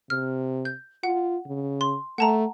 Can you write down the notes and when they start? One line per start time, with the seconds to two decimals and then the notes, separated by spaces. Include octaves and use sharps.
0.10 C3 F6
0.65 G6
1.03 F4 F#5
1.46 C#3
1.81 C6
2.18 A3 F#5 A5 A#5